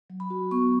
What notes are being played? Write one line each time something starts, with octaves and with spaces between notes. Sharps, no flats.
F#3
B5
F#4
B3 C#6